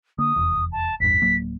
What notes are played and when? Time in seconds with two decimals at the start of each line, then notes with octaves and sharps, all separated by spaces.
0.18 D3 A#3 D#6
0.36 F1 E2
0.72 A5
1.00 A1 E2 G2 B6
1.22 D1 F#3 A#3